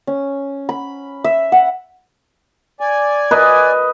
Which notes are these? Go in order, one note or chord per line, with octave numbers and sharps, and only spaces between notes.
C#4
B5
E5
F#5
D5 G#5
B4 D#5